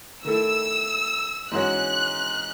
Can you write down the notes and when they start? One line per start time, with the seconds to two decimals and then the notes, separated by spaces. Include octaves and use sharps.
0.25 D#3 A3 E4 A4 E6
1.51 G#2 E3 G#3 C#4 F#4 F#6